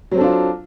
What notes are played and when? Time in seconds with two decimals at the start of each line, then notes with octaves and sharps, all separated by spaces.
0.12 F#3
0.15 C4
0.17 A4
0.20 D4
0.23 F4